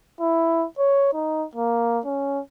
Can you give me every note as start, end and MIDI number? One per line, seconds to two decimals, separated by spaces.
0.20 0.66 64
0.79 1.12 73
1.14 1.45 63
1.55 2.00 58
2.05 2.40 61